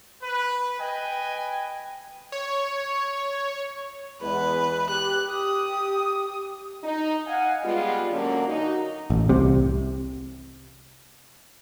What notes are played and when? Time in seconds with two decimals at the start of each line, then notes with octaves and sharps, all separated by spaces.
0.22 B4
0.80 B4 D#5 G5 G#5
2.32 C#5
4.22 E2 G#3 B4
4.90 G4 F#6
5.32 D#6
6.84 D#4
7.26 D#5 F5 F#5 G#5
7.63 G3 G#3 B3 F4
8.11 D3 F#3 A#3 C#4
8.47 D#4 F#4
9.10 A1
9.29 C2 C3